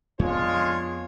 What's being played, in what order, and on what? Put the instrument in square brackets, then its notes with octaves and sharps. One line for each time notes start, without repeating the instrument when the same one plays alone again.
[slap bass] F2 B3 [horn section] G#3 D4 C#5 [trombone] F4